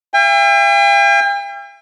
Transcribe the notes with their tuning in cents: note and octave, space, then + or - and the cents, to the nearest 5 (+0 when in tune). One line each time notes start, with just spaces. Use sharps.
E5 +40 G5 +45